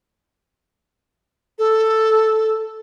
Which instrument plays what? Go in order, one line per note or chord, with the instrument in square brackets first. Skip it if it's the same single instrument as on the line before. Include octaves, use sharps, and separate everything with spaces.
[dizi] A4